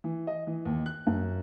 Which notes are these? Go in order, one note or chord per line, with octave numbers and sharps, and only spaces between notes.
E3
D#5
E3
D#2
F#6
F#2